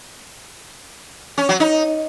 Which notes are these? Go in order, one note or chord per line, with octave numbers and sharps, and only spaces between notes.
C#4
F#3
D#4